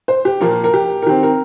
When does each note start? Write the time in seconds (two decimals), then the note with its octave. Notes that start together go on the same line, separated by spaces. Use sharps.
0.08 C5
0.25 G4
0.41 A#2 F3 A#3 A#4
0.64 A#4
0.74 G4
1.02 A#4
1.06 D#3 C4 G4
1.23 A#4